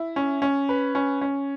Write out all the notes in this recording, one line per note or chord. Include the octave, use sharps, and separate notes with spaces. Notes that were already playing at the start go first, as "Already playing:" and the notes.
Already playing: E4
C#4
C#4
B4
C#4
C#4